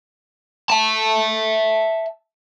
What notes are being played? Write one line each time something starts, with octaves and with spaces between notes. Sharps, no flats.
E5 A5